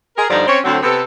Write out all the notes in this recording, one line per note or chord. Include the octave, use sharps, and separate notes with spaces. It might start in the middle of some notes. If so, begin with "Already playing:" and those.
G#4 A#4
G2 D3 F3 D#4 C5 D5
C4 C#4 C5 C#5
D2 D3 F#3 C4
C3 B3 A4